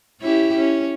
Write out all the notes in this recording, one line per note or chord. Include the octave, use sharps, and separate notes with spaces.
C#4 E4 G4
C#4